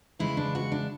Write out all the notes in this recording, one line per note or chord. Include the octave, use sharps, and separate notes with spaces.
C#3 E3 G#3 E4
D4
F#4
D4